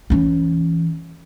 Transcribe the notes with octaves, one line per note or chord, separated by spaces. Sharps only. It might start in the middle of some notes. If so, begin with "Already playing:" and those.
E3 C#4